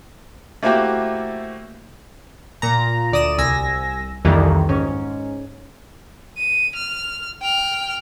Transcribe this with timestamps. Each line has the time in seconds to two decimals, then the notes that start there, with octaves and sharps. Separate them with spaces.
0.63 A3 A#3 C4 E4 F#4 G4
2.62 A#2 A#5
3.12 D2 D5 D#6 D#7 E7
3.38 C2 G#5 E6 A#6
4.25 C2 F2 D#3 E3 G3 A#3
4.69 G#2 C#4
6.37 D#7
6.75 F6
7.41 G5 F6